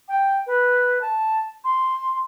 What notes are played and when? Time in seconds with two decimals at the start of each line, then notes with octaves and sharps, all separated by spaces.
0.08 G5
0.47 B4
1.01 A5
1.64 C6